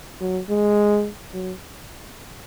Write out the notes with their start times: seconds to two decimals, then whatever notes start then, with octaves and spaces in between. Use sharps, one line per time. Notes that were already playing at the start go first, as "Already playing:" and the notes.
0.21 F#3
0.49 G#3
1.34 F#3